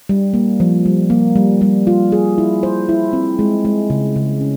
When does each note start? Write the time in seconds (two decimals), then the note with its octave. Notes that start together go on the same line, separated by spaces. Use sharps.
0.09 G3
0.34 A#3
0.60 F3
0.86 G3
1.10 A#3
1.36 G3
1.61 G3
1.87 F4
2.12 G#4
2.38 E4
2.63 C5
2.89 E4
3.13 C4
3.39 G#3
3.65 G#3
3.90 C#3
4.16 C#3
4.41 C#4